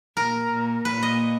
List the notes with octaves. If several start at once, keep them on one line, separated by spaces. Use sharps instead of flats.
A#2 A#4
A#2
A#2 B4
D#5